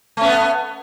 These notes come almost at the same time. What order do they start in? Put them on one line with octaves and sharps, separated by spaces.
A3 C#4 B3